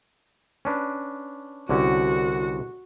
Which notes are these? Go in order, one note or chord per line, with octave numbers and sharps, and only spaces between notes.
C#4 D4 B4
C2 D3 C#4 F#4